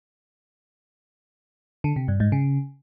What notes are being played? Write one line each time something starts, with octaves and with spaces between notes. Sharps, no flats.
D3
C3
G2
G#2
C#3